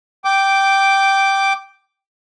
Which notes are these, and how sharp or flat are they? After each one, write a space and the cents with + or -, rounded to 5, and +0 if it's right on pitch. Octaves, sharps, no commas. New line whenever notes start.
G5 -5 D6 +0